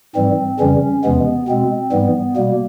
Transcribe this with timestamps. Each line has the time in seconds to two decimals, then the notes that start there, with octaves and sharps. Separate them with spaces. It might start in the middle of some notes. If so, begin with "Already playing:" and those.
0.15 G#2 E3 G3 C4
0.60 F2 C#3 E3 G3 C#4
1.04 E2 C3 E3 G#3 B3
1.48 B2 G#3 C4
1.92 G#2 E3 G3 B3
2.36 B2 G3 A#3